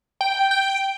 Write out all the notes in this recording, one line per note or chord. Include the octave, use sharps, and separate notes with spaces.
G5
G5